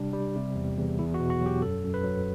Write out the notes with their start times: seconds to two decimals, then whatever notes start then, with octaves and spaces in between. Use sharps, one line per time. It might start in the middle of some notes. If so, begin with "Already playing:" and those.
Already playing: C3 G3 D4
0.13 G3
0.36 C3
0.56 E2
0.78 E2
0.99 E2 E4
1.14 F#4
1.19 B2
1.30 F#4
1.41 F#3
1.46 G4
1.62 F#2 A4
1.83 F#2
1.94 B4
2.04 F#3